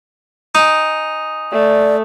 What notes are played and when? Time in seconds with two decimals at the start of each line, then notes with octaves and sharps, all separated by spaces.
0.55 D#4 G#5 D#6
1.52 A3 D5